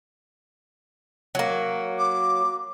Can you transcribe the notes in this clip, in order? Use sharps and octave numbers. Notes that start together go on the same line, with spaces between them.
F#3 A#3
D6